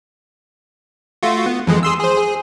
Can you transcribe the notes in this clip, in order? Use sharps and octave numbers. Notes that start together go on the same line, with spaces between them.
A3 F4 F#4
B3
F2 E3 G#3
G#4 C6 E6
G#4 C5
G#4